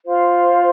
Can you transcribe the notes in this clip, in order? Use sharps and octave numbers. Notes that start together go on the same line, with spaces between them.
F4 C5 F5 C6